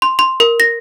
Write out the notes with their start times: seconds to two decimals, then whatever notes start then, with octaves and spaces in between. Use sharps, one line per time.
0.02 C6
0.19 C6
0.40 A#4
0.60 A#6